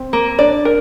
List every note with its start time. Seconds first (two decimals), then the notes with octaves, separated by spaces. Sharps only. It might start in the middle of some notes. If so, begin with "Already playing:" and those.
Already playing: C4
0.13 A#3
0.39 D4 D5
0.65 A#4